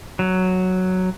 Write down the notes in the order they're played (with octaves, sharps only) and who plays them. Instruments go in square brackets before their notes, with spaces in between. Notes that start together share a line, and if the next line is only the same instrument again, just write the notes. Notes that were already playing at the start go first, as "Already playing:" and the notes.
[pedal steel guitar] F#3